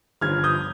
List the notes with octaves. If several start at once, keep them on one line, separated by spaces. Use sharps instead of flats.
G1 G2 F3 F6 G#6
D#6 G6